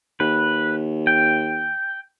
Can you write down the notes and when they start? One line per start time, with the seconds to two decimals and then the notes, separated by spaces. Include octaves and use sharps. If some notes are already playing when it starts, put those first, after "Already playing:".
0.20 D#2 B4
1.07 G5